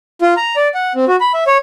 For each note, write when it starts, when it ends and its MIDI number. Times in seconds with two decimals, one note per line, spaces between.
0.22 0.34 65
0.37 0.56 82
0.56 0.68 74
0.74 0.93 78
0.95 1.05 60
1.08 1.16 66
1.20 1.32 83
1.34 1.44 76
1.47 1.57 73